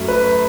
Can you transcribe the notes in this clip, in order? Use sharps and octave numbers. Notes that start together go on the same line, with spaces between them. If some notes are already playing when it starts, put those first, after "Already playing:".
Already playing: F#2 F#3 A3
B4